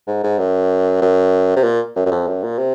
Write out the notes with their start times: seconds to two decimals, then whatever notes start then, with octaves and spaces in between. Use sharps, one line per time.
0.07 G#2
0.24 G#2
0.39 F#2
1.02 F#2
1.56 C3
1.64 A#2
1.96 F#2
2.06 F#2
2.12 F2
2.28 F#2
2.44 A#2
2.59 C3